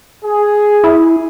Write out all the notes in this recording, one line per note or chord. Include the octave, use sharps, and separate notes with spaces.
G#4
E4